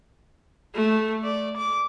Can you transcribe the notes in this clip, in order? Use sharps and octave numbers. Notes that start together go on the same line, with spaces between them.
A3
D5
D6